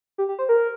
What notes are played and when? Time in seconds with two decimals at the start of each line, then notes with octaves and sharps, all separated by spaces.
0.18 G4
0.29 G4
0.39 C5
0.49 A#4